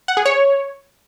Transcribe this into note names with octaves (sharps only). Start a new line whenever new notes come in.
F#5
G#4
C#5